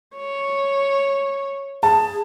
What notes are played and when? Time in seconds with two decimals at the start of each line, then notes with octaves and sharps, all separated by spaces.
0.17 C#5
1.83 G#4 A5